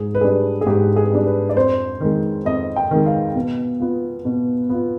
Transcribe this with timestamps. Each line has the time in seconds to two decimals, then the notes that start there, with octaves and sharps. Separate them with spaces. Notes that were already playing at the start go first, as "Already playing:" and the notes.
Already playing: G#2 G#4
0.15 B4
0.21 G3 D4 G#4
0.61 G#4
0.66 G#2 G4
0.96 G#4
1.12 G3 D4
1.26 B4
1.49 D5
1.56 F2 C5
2.00 D#3 G#3
2.45 F2 D#5
2.76 G5
2.91 D#3 G#3
3.06 F5
3.35 B2
3.80 B3 F4
4.25 B2
4.69 B3 F4